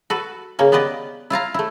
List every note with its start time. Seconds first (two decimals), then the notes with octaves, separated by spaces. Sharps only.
0.10 F#4 A4 B4
0.59 C#3 A#3 C#4
0.72 B3 G4 B4 D5 D#5
1.30 E4 F4 F5 A#5
1.54 A3 E4